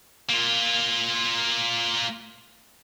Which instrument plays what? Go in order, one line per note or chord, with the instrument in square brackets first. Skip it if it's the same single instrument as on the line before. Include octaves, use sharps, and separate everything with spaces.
[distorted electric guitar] A#3 F4